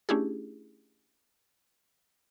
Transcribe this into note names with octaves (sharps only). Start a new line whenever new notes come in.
A3 C#4 D4 E4 G4 G#4